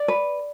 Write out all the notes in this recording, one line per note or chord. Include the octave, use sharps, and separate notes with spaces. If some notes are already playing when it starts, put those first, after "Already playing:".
Already playing: D5
B4